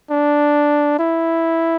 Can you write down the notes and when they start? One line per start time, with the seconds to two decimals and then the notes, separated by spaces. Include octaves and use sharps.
0.11 D4
0.99 E4